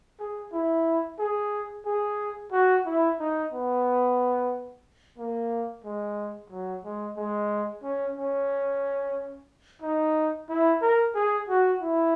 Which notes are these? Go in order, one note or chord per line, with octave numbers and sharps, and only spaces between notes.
G#4
E4
G#4
G#4
F#4
E4
D#4
B3
A#3
G#3
F#3
G#3
G#3
C#4
C#4
D#4
E4
A#4
G#4
F#4
E4